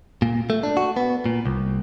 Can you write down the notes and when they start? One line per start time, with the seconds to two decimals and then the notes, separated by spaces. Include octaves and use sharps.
0.22 A#2
0.50 A3
0.63 D4
0.77 F#4
0.96 B3
1.26 A#2
1.46 C2